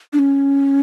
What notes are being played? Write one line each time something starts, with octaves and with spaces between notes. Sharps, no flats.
D4
C#4